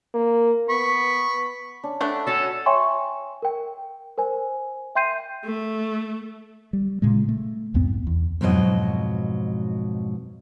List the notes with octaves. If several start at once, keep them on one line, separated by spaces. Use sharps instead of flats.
A#3
B3 B5 C#6
C#4 D4
A3 D4 F#5 A5 B5
C#4 F#4 A4
C#5 E5 G5 G#5 C6 C#6
A#4 G5
A#4 C5 G#5
E5 G5 C6 G6 C7 D#7
A3
G3
A#2 C#3 G#3
A3
C2 F2 G#2 B3
E2
F2 G#2 B2 F#3 D#5